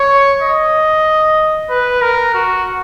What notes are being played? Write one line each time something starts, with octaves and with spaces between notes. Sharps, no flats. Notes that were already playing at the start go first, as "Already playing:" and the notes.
Already playing: C#5
D#5
B4
A#4
F#4